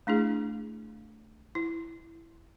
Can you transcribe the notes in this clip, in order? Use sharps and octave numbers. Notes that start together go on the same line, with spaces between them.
A3 D4 E4 G#4
E4